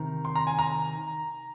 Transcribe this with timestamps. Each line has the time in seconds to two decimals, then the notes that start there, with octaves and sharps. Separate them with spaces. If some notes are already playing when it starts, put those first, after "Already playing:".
Already playing: C3 D#3 A#5
0.25 C6
0.36 A#5
0.47 G#5
0.59 A#5